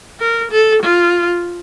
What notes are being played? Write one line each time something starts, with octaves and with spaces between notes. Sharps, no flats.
A#4
A4
F4